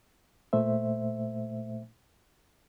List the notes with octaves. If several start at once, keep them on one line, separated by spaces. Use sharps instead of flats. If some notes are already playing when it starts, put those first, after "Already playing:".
A#2 A3 C5 E5